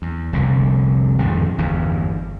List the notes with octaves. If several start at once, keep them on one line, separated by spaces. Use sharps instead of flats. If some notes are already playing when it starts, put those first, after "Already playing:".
E2
F1 C2 D3
G#1 F2 A2 D3
G1 E2 G2